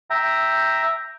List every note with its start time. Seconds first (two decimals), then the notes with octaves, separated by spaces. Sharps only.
0.10 E5 G5 A#5